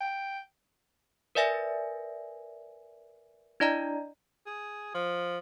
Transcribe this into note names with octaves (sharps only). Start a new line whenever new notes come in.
G5
A#4 B4 D5 E5 G#5 A#6
D4 E4 D5 D#5 A#5
G#4
F3